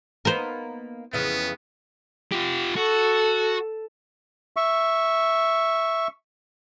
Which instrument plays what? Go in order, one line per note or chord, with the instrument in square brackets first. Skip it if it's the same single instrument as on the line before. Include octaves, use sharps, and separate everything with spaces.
[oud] A#3 B3 D#4 [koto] A#4 C5
[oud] F2 C#3 E3 [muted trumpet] B3
[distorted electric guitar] F4 G4
[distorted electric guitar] F#4 [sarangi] A4
[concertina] E5 C#6